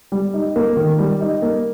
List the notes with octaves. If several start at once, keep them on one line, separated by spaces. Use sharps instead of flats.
G3
D#4
A#3
D#3
G3
D#4
A#3